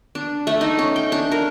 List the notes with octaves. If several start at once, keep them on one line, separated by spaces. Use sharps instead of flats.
D4
A3
D#4
C#4
G5
D4
A#4